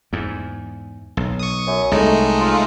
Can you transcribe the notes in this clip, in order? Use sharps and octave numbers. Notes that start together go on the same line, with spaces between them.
E2 G#2
B1
C#6 D#6
F#2
C2 A2 G#3 A3 D#4
F4